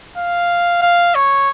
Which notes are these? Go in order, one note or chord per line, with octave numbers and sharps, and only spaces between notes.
F5
F5
C#5